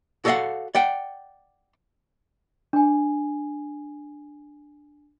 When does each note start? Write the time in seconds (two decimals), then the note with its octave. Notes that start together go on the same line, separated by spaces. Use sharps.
0.25 F#4 A4 D5 D#5 F5 F#5
0.75 D5 F#5 G5
2.73 D4 G#5